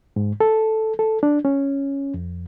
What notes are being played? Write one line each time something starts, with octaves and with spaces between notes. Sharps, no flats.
G#2
A4
A4
D4
C#4
F2